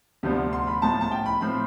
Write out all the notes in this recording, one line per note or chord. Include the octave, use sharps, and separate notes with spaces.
D2 C3 F3 B3 D4
C6
B5
A2 F3 B3 A5
A5
G5
B5
A2 F3 C4 B5